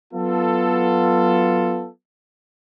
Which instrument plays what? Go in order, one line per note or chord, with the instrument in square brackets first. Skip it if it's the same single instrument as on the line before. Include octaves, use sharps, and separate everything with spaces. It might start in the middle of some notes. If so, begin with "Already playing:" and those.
[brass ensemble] F#3 B3 F4 A4